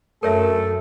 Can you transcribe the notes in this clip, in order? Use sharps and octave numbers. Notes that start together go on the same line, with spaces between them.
F#2 A3 A4 A#4 C#5 E5